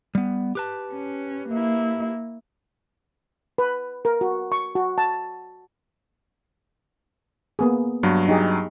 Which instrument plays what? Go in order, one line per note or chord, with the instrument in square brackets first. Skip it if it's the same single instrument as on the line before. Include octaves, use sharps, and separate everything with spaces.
[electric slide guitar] G3 B3
G4 B4 A5
[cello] C#4
A#3 E4
[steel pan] B4
A#4
F#4
C#6
F#4
A5
A#3 B3 G#4
[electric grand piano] G2 F#3
[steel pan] D#4 G4 G#4